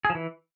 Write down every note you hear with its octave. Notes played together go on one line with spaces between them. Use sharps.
G#4
F3
E3